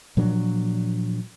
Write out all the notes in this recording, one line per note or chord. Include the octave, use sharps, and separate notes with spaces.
A#2 F3 F#3 D4